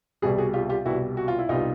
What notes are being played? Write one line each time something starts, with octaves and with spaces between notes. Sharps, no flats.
C2 B2 G3 F#4 G#4
F#4 G#4
F4 G4
F4 G4
C2 B2 G3 E4 F#4
F#4
F4
E4
C2 B2 G3 D#4 F4